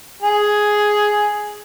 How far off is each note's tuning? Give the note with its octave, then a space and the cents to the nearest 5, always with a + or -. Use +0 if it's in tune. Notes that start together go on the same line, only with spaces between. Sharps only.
G#4 +5